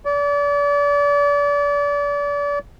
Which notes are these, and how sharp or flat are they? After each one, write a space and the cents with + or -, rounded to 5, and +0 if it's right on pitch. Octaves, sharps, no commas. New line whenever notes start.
D5 -35